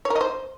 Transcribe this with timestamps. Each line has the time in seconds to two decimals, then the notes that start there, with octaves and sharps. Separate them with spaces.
0.05 C#5
0.10 A#4
0.16 D#5
0.21 C5